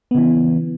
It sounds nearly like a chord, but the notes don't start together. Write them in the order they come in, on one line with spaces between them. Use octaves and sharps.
B3 C#3 E3